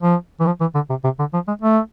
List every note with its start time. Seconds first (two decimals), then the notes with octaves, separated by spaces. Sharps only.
0.02 F3
0.40 E3
0.46 F3
0.60 E3
0.75 D3
0.90 C3
1.04 C3
1.19 D3
1.34 F3
1.48 G#3
1.62 A3